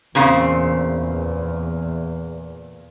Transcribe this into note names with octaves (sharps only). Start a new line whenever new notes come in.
E2 A#2 C#3 C4